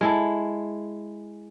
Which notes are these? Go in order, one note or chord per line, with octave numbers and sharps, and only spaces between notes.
G#3 E4 A4